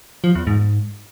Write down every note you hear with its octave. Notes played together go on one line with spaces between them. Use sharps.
F3
E2
G#2